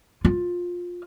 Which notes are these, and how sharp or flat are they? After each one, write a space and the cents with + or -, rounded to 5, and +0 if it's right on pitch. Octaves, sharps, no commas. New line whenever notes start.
F4 +15